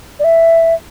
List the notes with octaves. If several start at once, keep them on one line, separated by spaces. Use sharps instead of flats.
D5
E5